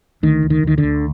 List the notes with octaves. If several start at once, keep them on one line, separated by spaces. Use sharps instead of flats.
D2 D#3
D2
D#3
D2 D#3
D3
D2